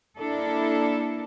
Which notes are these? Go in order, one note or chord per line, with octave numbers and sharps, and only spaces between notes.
A#3 D4 E4 A4 A#4